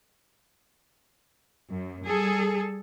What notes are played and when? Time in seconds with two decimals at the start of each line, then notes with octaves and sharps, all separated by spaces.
1.70 F#2
2.05 G3 G#4 A4